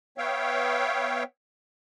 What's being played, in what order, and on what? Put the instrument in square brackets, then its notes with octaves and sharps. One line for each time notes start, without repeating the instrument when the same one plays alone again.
[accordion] B3 C#5 E5 F5 G5